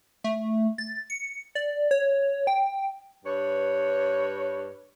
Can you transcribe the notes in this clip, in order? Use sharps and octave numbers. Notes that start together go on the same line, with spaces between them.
A3
A6
C#7
D5
C#5
G5
G2 B4 C#5